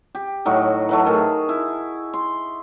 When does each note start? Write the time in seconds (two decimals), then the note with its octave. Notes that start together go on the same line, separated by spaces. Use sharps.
0.15 G4
0.45 A2 F#3 D#4 F#4
0.89 E3 F#3 A3
1.06 D#3 G#4
1.49 E4
2.14 C6